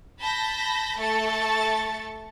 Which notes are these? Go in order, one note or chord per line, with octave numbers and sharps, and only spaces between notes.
A5 B5 G6 A#6
A3 A4 A5 C#6 A6